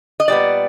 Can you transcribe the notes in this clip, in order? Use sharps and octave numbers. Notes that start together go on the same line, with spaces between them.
D#5
A#2 G3 B3 D5